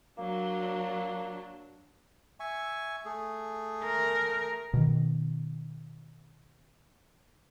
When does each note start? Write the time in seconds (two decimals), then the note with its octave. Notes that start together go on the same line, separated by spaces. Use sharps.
0.18 F#3 A#3 D4
2.40 E5 G#5 C#6
3.05 A3 G#4
3.84 A#4
4.74 B2 D#3